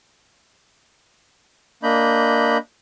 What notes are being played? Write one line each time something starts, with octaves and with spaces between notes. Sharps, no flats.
A#3 D4 D#5 B5 G6